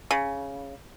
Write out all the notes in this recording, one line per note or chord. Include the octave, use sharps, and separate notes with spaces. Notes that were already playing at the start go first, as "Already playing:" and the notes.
C#3